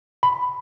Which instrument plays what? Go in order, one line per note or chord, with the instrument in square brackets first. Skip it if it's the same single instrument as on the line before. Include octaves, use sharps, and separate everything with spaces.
[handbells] B5